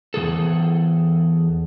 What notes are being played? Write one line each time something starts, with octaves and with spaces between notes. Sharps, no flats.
E2 D#3 G#4 A4